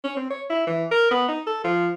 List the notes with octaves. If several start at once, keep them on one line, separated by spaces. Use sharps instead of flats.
C#4
C4
C#5
E4
E3
A#4
B3
D#4
A4
F3